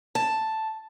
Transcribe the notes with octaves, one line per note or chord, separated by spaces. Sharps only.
A5